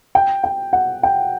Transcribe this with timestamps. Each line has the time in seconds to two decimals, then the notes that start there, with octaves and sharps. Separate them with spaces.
0.15 G5
0.44 G5
0.73 F#5
1.03 G5